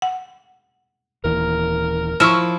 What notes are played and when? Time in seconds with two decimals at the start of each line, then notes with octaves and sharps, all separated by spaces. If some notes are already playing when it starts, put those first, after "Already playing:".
0.02 F#5
1.24 D#1 D#2 E3 A#4
2.20 F3 E4 E5 C#6 E6 F6